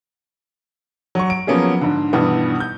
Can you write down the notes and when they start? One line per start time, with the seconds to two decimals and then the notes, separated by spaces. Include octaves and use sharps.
1.15 F#3 C#6
1.30 D7
1.47 F3 F#3 A#3 B3 C#4 G#4
1.81 G#2 D3
2.13 G2 B2 D#3 E3 G3 B3
2.60 G6